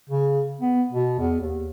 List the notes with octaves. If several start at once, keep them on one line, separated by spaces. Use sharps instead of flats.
C#3
B3
B2
E2
D#2